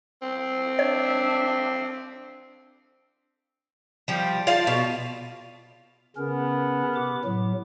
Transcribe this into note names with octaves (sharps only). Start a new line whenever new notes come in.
C4
D4 C#5 E5
F3 G3
F4 D5 F5 A5
B2
C#3 B3 C#4 A#4
C3 D6
A2 F#3